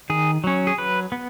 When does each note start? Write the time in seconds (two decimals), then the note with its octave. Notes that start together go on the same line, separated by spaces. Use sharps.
0.10 D#3 G#4
0.44 F#3 C#4
0.67 G#4
0.78 F#3 B4
1.12 B3